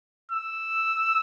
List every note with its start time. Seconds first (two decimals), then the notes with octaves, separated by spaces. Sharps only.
0.31 E6